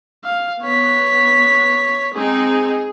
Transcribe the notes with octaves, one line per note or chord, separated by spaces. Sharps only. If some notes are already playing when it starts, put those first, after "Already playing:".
F5
B3 C#5 B6
G#3 C4 D#4 G#4